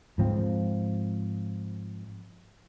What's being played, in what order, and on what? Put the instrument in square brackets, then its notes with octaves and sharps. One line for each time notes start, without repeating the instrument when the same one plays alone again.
[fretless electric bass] G#2 F3 C4